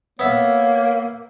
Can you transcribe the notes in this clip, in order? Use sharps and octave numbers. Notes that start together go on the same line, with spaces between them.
A#3 B3 C#5 E5